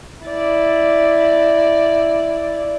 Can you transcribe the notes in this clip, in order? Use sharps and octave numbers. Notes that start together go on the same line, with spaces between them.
E4 D5